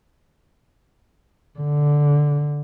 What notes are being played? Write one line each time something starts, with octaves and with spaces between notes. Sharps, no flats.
D3